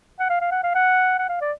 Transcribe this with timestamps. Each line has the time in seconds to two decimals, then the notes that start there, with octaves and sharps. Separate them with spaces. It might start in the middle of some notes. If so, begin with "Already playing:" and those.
0.19 F#5
0.30 F5
0.41 F5
0.51 F#5
0.64 F5
0.75 F#5
1.19 F#5
1.29 F5
1.41 D5